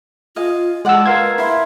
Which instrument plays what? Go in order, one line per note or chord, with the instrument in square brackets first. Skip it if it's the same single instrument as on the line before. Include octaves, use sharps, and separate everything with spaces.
[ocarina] F4 [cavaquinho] D#5 F5 G#5
[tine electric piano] G#3 E6 [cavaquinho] D5 F#5 A5
[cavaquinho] F4 [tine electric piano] A#4 F5 G#6 [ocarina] B4
[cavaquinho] E4 C6 [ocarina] E5